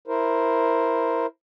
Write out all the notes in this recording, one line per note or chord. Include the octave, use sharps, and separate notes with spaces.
E4 A#4 C5